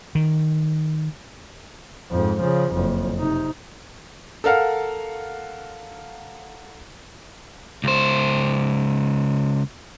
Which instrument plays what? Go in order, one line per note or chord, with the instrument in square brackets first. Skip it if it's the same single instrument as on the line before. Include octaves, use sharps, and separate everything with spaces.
[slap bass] D#3
[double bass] F2 G#2
C#3 F3
F#1 F2
C3 D#4
[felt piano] A4 A#4 F5 F#5
[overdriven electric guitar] C#2 C5